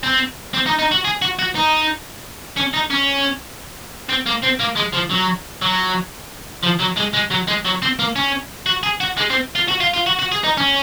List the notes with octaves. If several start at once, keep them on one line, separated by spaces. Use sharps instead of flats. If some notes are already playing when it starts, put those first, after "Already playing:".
C4
C4
D#4
D#4
F#4
G#4
F#4
F#4
D#4
C#4
D#4
C#4
C4
A#3
C4
A#3
G#3
F3
F#3
F#3
F3
F#3
G#3
G#3
F#3
G#3
F#3
C4
A#3
C#4
F#4
G#4
F#4
G#3
C4
F4
F#4
F4
F4
F#4
F#4
G#4
D#4
C#4